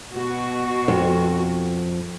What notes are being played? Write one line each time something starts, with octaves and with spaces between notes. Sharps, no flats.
B2 F#4
F2